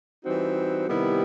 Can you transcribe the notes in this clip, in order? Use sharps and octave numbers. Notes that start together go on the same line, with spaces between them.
E3 G3 C4 D#4 F#4
C3 D#3 G3 B3 E4